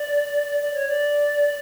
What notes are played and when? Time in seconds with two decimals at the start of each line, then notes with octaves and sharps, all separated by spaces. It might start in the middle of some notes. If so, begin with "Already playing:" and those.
Already playing: D5
0.60 D5
0.73 C#5
0.87 D5